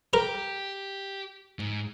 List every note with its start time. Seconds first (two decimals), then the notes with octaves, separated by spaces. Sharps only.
0.14 G4 A#4
1.59 G#2